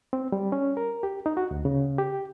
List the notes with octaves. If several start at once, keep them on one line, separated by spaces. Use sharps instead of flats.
C4
G3
C#4
A#4
G4
D#4
F#4
D2
C#3
G4